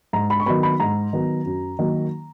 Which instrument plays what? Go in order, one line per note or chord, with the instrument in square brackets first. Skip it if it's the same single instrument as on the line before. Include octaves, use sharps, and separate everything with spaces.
[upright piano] G#2 A#5
B5
C#6
D#3 F#3 B3 B5
B5
G#2 A#5
D#3 F#3 B3
F#2
D#3 F#3 A#3